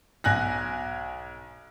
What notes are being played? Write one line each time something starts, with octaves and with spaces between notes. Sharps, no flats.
B1 G#5 F#6 A#6